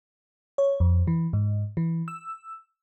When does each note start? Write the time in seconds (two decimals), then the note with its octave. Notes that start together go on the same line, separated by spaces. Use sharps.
0.58 C#5
0.80 F2
1.07 E3
1.33 G#2
1.77 E3
2.08 E6